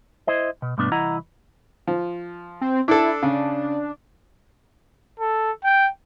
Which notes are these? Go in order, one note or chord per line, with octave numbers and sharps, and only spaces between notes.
E4 C5 D#5
B2
G2 B2 A3 B3 D4
C2 E3 E4 D#5 F#5 A#5
F3
C4
D4 E4 A4
C#3 D4
A4
G5